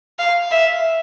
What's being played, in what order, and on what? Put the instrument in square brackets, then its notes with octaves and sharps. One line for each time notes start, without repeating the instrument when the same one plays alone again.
[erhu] F5
E5